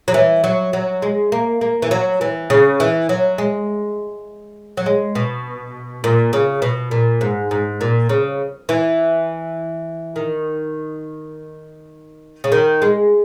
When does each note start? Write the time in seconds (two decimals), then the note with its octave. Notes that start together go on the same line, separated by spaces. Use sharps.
0.08 F#3
0.14 E3
0.44 F#3
0.73 F#3
1.02 G#3
1.32 A#3
1.61 A#3
1.82 E3
1.91 F#3
2.21 E3
2.50 C#3
2.80 E3
3.09 F#3
3.38 G#3
4.77 F#3
4.86 G#3
5.15 B2
6.04 A#2
6.33 C#3
6.62 B2
6.91 A#2
7.21 G#2
7.51 G#2
7.81 A#2
8.09 C#3
8.69 E3
10.16 D#3
12.44 C#3
12.52 D#3
12.82 G#3